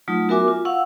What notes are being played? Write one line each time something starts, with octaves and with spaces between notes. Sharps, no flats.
F#3 A3 D#4 F4
B3 F#4 A#4 E5 G#5 D6
F4
F5 F#5 C#6 E6